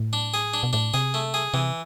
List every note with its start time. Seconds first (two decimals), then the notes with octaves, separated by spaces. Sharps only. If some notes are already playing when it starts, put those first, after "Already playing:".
Already playing: A2
0.13 D4
0.34 G#4
0.54 D4
0.63 B2
0.73 A2 D4
0.94 C3 G#4
1.14 A3
1.34 G#4
1.54 C3 E3